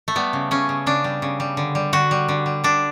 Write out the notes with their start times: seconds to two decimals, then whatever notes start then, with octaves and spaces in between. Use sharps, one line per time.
0.08 A3
0.15 G3 B3
0.33 C#3
0.51 C#3 C#4
0.69 C#3
0.86 C#3 D4
1.04 G3
1.22 C#3
1.40 G3
1.57 D3
1.75 G3
1.93 D3 F#4
2.11 G3
2.28 D3
2.46 G3
2.64 D3 D4